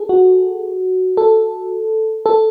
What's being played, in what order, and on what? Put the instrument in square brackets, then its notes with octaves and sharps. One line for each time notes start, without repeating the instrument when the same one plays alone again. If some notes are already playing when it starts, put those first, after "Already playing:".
Already playing: [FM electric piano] G#4 A4
F#4
A4
A4